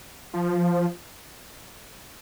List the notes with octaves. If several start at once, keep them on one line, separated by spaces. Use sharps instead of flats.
F3